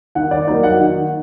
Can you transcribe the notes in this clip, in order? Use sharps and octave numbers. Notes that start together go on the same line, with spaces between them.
D#3 F#5
D5
F#3 A#3 D#4 D5
F#5
D#3